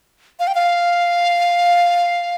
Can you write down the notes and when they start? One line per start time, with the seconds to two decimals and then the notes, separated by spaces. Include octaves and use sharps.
0.40 F5
0.47 G5
0.55 F5